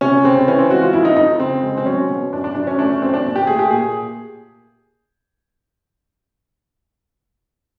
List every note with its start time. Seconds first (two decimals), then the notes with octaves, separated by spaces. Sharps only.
0.01 C3 C#4
0.24 C#2 C4
0.47 E3 C#4
0.59 C4
0.70 G#3 F#4
0.82 F4
0.93 F2 E4
1.05 D#4
1.16 F2 D#4
1.40 C#3 C4
1.63 G#3
1.78 C4
1.85 F#3 C#4
2.09 B2
2.32 F#2 D4
2.44 D4
2.55 F#2 D4
2.67 C#4
2.79 A3 D4
2.89 C#4
3.01 F#2 C4
3.14 D4
3.25 A#2
3.36 G4
3.47 A3 G#4
3.59 G4
3.71 A#2 G#4